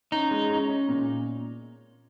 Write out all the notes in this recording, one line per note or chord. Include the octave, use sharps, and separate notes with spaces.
C#4 D#4
G#3
C#4
C#4
A#2